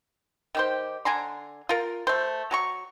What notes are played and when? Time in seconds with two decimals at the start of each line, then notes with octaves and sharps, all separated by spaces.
0.55 D#3 G4 C5
1.05 D3 G#5 A#5 C6
1.69 F4 A#4
2.07 A3 C5
2.51 F#3 A#5 C#6